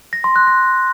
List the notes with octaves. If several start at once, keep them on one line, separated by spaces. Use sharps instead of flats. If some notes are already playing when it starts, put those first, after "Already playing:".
A#6
C6
F#6
A#6